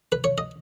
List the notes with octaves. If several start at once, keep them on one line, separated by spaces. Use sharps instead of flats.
B4
C#5
D#5